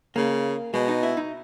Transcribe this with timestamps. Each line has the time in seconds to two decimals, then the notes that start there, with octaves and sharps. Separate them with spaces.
0.16 C#3 A#3
0.74 B2 G#3
0.88 D#4
1.03 E4
1.17 D#4